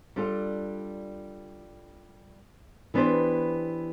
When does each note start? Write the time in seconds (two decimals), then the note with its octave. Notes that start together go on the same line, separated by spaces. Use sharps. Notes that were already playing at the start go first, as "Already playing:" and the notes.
0.16 G3 D4 F4 A4
2.94 E3 B3 D4 G4 C5